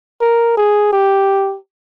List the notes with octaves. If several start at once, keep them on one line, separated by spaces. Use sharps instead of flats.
A#4
G#4
G4